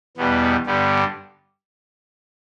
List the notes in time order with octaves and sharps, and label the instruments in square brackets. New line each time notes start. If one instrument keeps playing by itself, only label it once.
[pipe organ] E2 B2 G3 B3
G2 D3 G3 B3